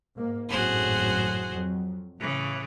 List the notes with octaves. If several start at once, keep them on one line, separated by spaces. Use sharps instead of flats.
G#2 A#3
G#1 F#2 A2 F#4 G#4 C5
F2 F#3
A2 C#3 E3